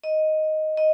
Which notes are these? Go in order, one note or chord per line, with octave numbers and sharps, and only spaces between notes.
D#5
D#5